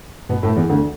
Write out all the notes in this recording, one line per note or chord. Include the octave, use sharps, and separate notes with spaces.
B2 B3
A2 A3
E2 E3
D2 D3